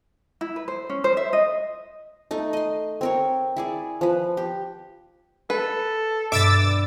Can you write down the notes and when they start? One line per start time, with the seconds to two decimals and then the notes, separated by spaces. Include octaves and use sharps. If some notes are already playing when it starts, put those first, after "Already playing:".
0.41 E4
0.56 B4
0.68 C5
0.90 C#4
1.04 C5
1.17 E5
1.33 D#5
2.31 A3 D#4
2.53 D#5 C6
3.01 C4 A#4 C#5
3.56 E4 G#4 D5
4.01 F3 B4
4.37 G4
5.50 A4 B4
6.32 G2 B2 E5 D6 E6 A6